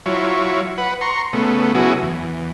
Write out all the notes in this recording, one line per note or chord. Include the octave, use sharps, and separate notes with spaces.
F#3 E4 F4 C#5
B4 F#5
A#5 C6 C#6
C#3 A3 B3
C#3 F#3 B3 E4 F#4 G#4
E2